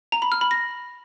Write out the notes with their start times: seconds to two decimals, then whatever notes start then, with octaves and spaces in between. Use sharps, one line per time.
0.12 A#5
0.22 B5
0.32 F6
0.41 B5
0.51 A#6